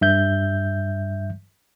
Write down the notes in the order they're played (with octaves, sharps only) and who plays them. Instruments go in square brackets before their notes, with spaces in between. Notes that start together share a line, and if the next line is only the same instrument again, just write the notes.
[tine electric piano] G2 E5 G6